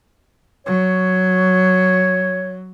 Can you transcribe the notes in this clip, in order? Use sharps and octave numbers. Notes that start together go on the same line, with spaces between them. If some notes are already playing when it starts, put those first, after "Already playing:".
F#3 C#5